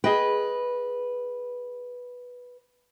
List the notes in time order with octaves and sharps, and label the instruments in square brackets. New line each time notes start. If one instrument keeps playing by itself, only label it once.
[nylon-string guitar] G#4 D#5 G5 [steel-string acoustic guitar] B4